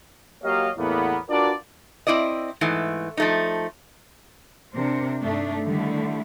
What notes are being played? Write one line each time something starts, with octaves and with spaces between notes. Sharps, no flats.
F#3 A#3 G4 C#5 D#5 F5
E2 A2 A#3 B3
D4 F4 F#4 A#4 B4 D5
C4 E4 D5 D#5
G#2 E3 A3
F3 A3 D#4
C3 D4 A#4 C5
G2 A3 D4 D#4
D3 D#3 G3 A3 E4